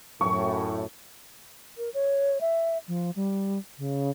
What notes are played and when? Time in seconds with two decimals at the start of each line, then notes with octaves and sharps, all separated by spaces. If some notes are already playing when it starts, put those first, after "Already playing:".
0.21 F#2 A2 C#6
1.78 A#4
1.94 C#5
2.41 E5
2.88 F3
3.16 G3
3.78 C#3